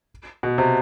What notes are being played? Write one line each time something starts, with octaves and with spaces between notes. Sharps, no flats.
B2
C3